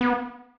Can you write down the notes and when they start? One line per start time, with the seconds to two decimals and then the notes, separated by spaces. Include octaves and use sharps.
0.01 B3